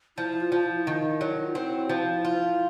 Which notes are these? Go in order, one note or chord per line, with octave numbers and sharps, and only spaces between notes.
F3 E4
F4
F3
E4
D#3 D#4
E4
F#3
D#4
F4
C4 E4
F3
F4